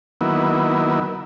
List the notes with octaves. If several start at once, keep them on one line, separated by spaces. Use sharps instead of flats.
D#3 F#3 A#3 B3 E4